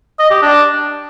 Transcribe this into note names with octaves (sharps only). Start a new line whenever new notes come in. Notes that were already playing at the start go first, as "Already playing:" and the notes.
D#5
G4
D4